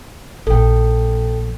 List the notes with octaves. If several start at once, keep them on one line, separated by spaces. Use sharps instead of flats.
A#1 A4 G5